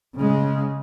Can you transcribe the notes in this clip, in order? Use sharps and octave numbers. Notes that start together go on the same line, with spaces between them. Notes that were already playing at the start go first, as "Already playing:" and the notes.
C#3 G#3